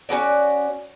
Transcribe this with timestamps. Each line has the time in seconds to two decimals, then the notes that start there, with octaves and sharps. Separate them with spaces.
0.09 C#4 F4 F#4 D5